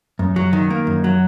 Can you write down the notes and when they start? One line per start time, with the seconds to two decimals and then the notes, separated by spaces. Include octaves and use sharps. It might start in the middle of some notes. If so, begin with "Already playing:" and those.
0.19 F#2
0.36 F#3
0.53 D#3
0.70 A#3
0.87 F#2
1.04 F#3